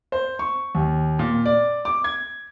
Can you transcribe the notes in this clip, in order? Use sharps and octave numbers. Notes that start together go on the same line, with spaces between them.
C5
C#6
D#2
A#2
D5
D6
G#6